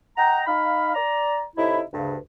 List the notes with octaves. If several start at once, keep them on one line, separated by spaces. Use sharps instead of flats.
D#5 F#5 G5 A#5
D#4 F5 B5
D5 A#5
A2 C3 D#4 E4
D2 G2 C#3